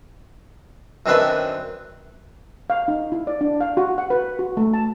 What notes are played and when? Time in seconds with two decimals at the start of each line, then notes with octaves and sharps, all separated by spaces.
1.06 F#2 D#3 C4 D4 B4 E5
2.70 F5
2.88 D#4
3.12 E4
3.27 D5
3.41 D4
3.61 F5
3.77 F#4
3.98 F#5
4.10 B4
4.39 F#4
4.57 A3
4.74 A5